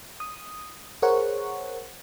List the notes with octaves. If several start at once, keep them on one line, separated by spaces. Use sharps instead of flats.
D#6
G#4 A#4 C5 C#5 F#5 C#6